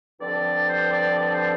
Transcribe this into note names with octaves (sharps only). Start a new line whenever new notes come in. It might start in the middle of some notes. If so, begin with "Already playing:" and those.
G2 D3 F3 C4 D5
C5
D5
D5
C5